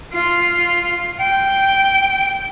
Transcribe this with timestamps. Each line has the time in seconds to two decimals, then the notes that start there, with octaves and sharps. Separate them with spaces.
0.13 F4
1.21 G5